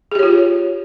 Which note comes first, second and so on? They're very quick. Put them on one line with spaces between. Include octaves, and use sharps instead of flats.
G#4 G4 C#5 F4